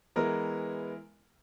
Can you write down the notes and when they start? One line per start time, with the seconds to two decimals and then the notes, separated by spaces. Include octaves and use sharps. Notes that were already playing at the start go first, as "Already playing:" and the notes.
0.16 E3 G#3 B3 E4 A#4